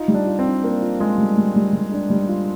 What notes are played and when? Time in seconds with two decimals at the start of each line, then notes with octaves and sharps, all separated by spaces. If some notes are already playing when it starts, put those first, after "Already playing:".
Already playing: D#4 F4
0.08 G3
0.14 D4
0.27 F4
0.39 C4
0.45 D4
0.64 A#3 F4
0.82 F4
1.00 G#3 F4
1.18 G3
1.37 G3
1.56 G3
1.73 G3
1.91 D4
2.10 G3
2.28 F4